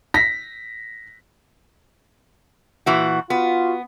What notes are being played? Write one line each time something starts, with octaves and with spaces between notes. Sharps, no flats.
A#6 B6
A#2 E3 F#4
B3 F4 F#4